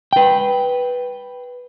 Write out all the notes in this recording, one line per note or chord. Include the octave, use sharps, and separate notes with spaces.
B4 G5